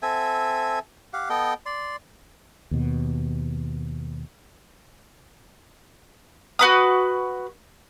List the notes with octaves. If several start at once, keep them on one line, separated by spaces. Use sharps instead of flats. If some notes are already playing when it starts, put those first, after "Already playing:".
C4 A4 E5 G#5
G4 F5 F#5
B3 A4 D#5 G5
D5 C6
D#2 B2
F#4 B4 D#6